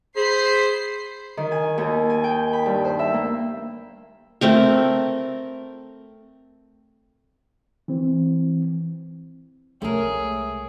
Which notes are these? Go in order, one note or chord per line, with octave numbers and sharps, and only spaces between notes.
G#4 C5 B5 C7
D#3
G#5
D#2
G#5
G5
B5
G2
C5
E5
A#3
A3 C4 A#4
E3 C4
C2 G#3 A3 G#4 A#4 C#5